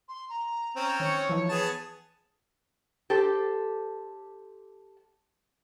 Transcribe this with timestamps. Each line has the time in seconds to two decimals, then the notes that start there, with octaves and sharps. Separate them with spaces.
0.09 C6
0.29 A#5
0.76 C4 C#4
1.00 D#3 C#5
1.29 E3 F3 D#4
1.49 B3 G#4 A5
3.10 G4 A4 C5